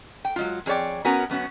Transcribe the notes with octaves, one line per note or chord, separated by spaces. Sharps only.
G5
F#3 G#3 F4
F2 G#4 C#5 D5 G5
B3 C#4 F#4 A#4 G#5
F#2 B3 C#4 F#4